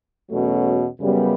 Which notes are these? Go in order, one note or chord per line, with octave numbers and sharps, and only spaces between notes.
E2 B2 F#3 A3 C#4
F#2 C#3 G3 B3